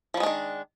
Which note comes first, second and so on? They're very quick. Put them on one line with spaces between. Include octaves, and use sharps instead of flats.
F3 G3 G#3 D4 D#3